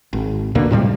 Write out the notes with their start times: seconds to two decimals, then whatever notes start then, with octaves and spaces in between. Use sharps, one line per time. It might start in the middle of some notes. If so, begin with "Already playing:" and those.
0.13 G#1
0.55 D2 B2 D3 A#3
0.71 A2 C3 G3 G#3